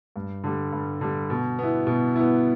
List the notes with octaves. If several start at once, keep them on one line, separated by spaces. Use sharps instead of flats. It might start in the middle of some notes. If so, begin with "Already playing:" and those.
G2
D3 G3
G2
D3 G3
B2
B3 E4
B2
B3 E4